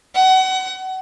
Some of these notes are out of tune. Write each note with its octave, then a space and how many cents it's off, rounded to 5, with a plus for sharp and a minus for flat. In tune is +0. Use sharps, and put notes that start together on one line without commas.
F#5 +30